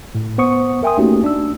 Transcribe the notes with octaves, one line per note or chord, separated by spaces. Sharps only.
A2
B3 C5 F#5 C#6 D#6 C#7
A#4 E5 G5 G#5 C6 D#6
A3 A#3 C#4 D#4 F#4 G4
D4 D#4 E6